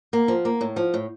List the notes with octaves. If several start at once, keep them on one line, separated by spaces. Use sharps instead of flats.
A#3
F3
A#3
A2
F3
A2